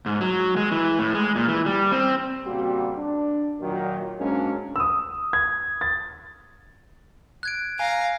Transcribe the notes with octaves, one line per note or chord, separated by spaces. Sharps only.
G#2
F#3
G#3
E3
A2
G#3
A#2
E3
G3
C4
A#2 C#3 G3 C4 F#4
D4
A#2 D#3 F#3
G#2 F#3 G#3 A#3 C#4 D4
D#6 E6
G#6
A6
F#6 G#6 D7
F5 G#5 A#5